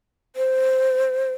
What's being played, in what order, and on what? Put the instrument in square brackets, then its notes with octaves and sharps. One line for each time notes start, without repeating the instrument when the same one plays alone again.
[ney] C5